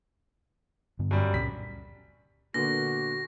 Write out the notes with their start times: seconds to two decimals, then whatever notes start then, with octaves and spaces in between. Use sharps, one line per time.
0.99 G2 D3 B3
1.11 F#2 G3
1.34 C#2 A#2 C#4 B6
2.54 A#2 D3 B3 F#4 A#6